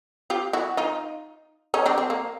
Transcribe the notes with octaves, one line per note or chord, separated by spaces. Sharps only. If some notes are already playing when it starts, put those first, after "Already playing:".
F4 G4
E4 F#4
D#4 F4
C#4 D#4
C4 D4
C4
A#3